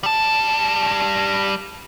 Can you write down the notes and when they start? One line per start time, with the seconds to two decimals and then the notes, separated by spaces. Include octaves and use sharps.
0.03 G3 A5